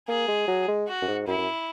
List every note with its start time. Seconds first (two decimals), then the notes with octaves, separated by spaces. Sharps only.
0.08 A#3 G#4
0.28 G#3
0.48 F#3
0.68 G#3
0.88 F#4
1.02 F#2
1.08 G#2
1.27 F#2 E4
1.38 F#2